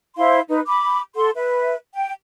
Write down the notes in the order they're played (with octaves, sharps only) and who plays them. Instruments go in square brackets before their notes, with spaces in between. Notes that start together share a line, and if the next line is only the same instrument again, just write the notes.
[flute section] E4 C5 F5 C6
D#4 B4
B5 D6
A4 F#5 C6
B4 E5
G5